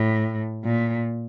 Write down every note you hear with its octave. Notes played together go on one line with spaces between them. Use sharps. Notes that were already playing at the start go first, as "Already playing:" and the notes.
Already playing: A2
A#2